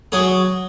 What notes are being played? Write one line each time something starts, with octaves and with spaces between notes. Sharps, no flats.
F#3 G#4